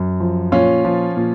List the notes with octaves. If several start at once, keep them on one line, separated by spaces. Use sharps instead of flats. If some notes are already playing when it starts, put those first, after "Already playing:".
Already playing: F#2
F3
A#2 C#4 F4
F3
A#2